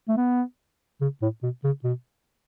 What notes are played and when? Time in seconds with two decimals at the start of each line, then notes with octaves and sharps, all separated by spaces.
0.09 A3
0.17 B3
1.01 C#3
1.22 A2
1.43 B2
1.64 C#3
1.84 B2